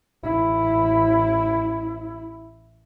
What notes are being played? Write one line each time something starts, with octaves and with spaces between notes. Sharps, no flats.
A1 E4